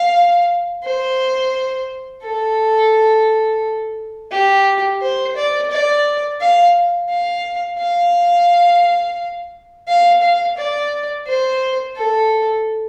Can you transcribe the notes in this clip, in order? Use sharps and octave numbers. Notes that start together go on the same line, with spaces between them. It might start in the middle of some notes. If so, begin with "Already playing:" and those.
Already playing: F5
C5
A4
G4
C5
D5
D5
F5
F5
F5
F5
F5
D5
C5
A4